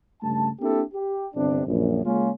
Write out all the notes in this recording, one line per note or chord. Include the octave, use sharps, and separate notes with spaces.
G2 C#3 A3 A5
A#3 C4 D4 E4 G4 A4
G4
G1 C3 D4
A#1 F#2
C#3 G#3 A#3 C#4 F4